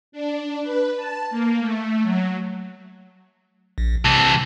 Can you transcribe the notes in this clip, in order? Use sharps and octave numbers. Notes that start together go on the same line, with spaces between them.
D4
B4
A5
A#3
A3
F#3
A#1
C2 E3 A5